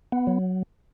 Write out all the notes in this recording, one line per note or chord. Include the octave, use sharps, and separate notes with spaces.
B3
F#3